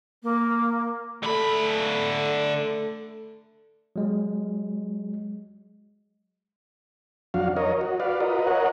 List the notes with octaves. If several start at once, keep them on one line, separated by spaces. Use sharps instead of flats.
A#3
D3 A3 A4 B5
F#3 G#3
F2 F#3 D4 F#4 F5
A#4 C#5 D#5
F#4
F#4 B4 D5 F5
F4 F#4 A#4 B4 D#5
A#4 C#5 D#5 F#5